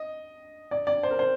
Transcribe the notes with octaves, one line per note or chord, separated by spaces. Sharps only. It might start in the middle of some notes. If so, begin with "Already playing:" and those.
Already playing: D#5
D5
D5
C5
A#4
C5